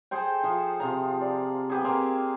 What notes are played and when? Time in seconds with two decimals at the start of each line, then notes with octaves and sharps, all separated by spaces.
0.11 G#4 A4 C5 G5
0.44 F3 E5
0.80 C3 F3 A#5
1.21 D5
1.70 B3 G4 G#4
1.84 A#3 C4 C5 A#5